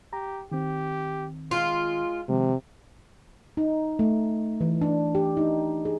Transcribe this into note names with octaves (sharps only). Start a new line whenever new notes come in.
G4 A#5
D#3 C4 G4
G#3 F4
C3 D#3 F3 G#3
D#4
A3
E3
D4
G4
D#4
G#4